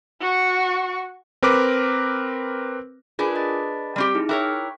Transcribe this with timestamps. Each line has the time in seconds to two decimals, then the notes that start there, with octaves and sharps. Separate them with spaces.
0.21 F#4 C#6
1.43 C4 A#4 B4 D6
3.19 D4 F4 G#4 A#4 B4 G#5
3.35 D#5 B5 A6
3.96 G3 C4 G4
4.15 D#4 E4 G#4
4.29 E4 A#4 C#5 G5 D6 F#6